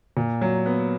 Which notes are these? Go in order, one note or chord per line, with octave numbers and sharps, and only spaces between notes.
A#2
F#3
B3